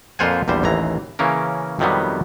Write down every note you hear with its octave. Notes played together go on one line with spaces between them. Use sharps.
F2 A#2 F4 C5 F#5 G#5
A#1 E2 G3 C5
A1 D#2 E3 A#5
C#3 E3 A#3 C#4 A#4
F2 C3 D#3 F#3 G3 B3